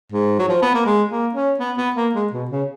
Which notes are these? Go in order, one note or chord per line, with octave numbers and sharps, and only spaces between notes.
G#2
F#3
F3
B3
A#3
G#3
A#3
C#4
B3
B3
A#3
G#3
B2
C#3